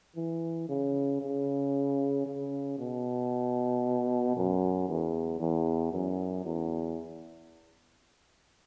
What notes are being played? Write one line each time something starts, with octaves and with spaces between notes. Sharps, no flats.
E3
C#3
C#3
C#3
B2
F#2
E2
E2
F#2
E2